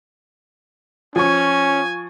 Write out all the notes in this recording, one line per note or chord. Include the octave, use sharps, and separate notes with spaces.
F3 C#4 G#5 C#6